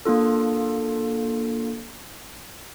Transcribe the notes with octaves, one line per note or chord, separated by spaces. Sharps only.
A#3 D4 F4 A4